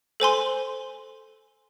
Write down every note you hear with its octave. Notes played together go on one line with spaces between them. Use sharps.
A4 C5 G#5 C6